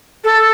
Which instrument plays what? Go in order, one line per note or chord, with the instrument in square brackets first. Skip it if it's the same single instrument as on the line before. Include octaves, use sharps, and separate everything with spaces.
[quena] A4